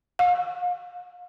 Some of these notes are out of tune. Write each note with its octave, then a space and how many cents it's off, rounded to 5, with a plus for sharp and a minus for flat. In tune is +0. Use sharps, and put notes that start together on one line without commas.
F5 +40